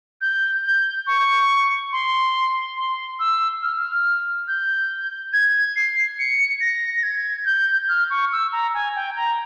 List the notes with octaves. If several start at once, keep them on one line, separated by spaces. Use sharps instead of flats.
G6
G6
C#6
C6
C6
E6
F6
G6
G#6
C7
C#7
A#6
A#6
G#6
G6
F6
C#6
E6
A#5
G#5
G5
A#5